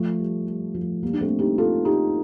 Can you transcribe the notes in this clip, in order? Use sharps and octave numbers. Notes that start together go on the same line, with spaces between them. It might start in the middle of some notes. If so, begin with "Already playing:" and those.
Already playing: F3 A3
G3
G3
F3 A3
G3 A#3
D4
A3 C4
D#4 G4
F4 A4
D#4 G4